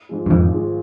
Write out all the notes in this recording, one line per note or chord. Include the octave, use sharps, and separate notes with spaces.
G#2 F3 G#3
G2
G#1 F2 G#2
G#2 F3 G#3